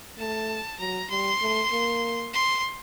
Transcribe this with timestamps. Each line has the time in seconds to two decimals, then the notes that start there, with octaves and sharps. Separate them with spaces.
0.18 A3 A5
0.79 F#3 A#5
1.10 G3 C6
1.41 A3
1.72 A#3
2.34 C6